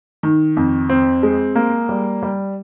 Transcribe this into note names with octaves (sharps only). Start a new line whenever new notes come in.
D#3
F2
C4
G#3
A#3
G3
G3